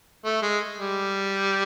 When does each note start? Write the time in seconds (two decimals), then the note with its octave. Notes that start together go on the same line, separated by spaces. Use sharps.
0.25 A3
0.42 G#3
0.79 G3